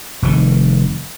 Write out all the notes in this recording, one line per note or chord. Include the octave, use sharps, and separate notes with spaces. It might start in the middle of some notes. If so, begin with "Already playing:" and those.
F1 D#3